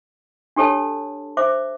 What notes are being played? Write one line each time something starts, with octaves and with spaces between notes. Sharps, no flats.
D4 G4 A4 C#5 A5
C5 E5 D6